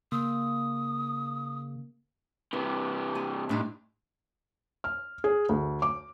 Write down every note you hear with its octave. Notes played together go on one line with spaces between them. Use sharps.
C#3 A#3 D#6
C3 E3 B4
G4 G#5
C2 A2 D4 D#4
F6
G#4
D2
D6